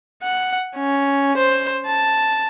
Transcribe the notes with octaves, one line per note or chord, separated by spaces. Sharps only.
F#5
C#4
C5
A5